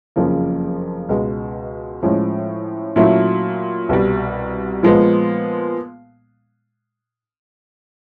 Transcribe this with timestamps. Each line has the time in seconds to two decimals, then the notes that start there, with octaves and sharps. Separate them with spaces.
0.16 F#1 F2 C#3 F3 A#3
1.09 C#2 B2 G#3
2.02 A2 F3 G#3 C#4
2.96 A#2 F#3 A3 C#4 E4
3.89 C2 B2 G3
4.83 A#2 F3 G#3 B3